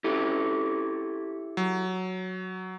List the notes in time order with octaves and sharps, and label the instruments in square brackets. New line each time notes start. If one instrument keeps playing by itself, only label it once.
[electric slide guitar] E4 G4 A4
[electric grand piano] F#3